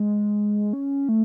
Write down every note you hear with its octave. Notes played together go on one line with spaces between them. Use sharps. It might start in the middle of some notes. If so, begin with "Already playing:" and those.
Already playing: G#3
C#4
A3